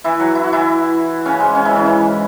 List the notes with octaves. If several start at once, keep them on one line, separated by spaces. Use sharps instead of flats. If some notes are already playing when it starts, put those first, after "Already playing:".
E3 E4
F#3 F#4
E4
F#4
E3 E4
C#3 C#4
G#2 G#3
C#3 C#4
E3 E4
C#3 C#4
E3 E4